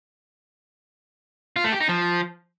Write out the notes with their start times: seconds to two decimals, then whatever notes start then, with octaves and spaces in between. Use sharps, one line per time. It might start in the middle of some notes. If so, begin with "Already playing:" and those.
1.56 F4
1.64 A3
1.72 G4
1.81 D#4
1.89 F3